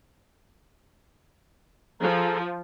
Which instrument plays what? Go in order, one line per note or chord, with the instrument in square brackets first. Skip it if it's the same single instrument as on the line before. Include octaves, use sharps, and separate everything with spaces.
[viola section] F3 [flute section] G#4 A4 A#5